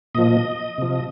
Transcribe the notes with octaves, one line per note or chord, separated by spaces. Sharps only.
A#2 F3 D#5
C3 F3